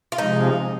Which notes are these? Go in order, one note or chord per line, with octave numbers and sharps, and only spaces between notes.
F4
C3 F3 G#3 D#4